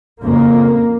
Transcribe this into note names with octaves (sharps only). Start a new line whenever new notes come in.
F2 C#3 A#3